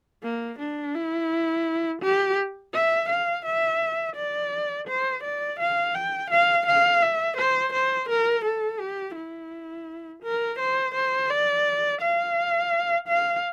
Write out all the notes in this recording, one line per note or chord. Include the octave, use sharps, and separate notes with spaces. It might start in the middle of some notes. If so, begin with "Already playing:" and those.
A#3
D4
E4
G4
E5
F5
E5
D5
C5
D5
F5
G5
F5
F5
E5
C5
C5
A#4
A4
G4
E4
A#4
C5
C5
D5
F5
F5